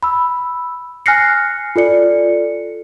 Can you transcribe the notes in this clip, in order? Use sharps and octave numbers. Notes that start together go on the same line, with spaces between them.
B5 E6
G#5 F6 F#6 A#6 C7 C#7
F4 A4 D5 C#7